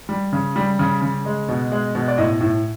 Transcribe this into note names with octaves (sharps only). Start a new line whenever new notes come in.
G3
C#3
G3
C#3
C#3
G#3
B2
G#3
B2
D5
A2 D#5
A2